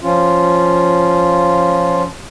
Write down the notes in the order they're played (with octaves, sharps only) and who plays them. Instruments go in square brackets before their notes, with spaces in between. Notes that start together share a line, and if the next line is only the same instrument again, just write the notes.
[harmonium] F3 C#4 F4